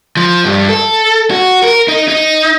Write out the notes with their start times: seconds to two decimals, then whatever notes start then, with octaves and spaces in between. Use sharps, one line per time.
0.17 F3
0.45 G2
0.69 A4
1.31 F#4
1.64 A#4
1.88 D#4
2.08 D#4